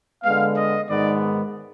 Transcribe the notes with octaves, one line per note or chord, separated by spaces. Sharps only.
D3 G#3 B3 F5
D#5
G#2 D#3 G#3 B3 D5